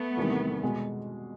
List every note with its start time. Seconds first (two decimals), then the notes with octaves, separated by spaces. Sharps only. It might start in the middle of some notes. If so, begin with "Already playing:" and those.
Already playing: A3 B3
0.17 E2 C3 D#3 G3
0.63 B2 G#3